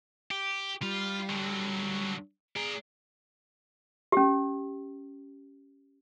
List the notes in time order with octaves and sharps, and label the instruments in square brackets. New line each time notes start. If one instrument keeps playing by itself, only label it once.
[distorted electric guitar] G4
[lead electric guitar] G3 [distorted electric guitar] F4
[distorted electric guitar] D3 F#3
[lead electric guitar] G#4 [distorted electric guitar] D5 A#5
[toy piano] C#4 G4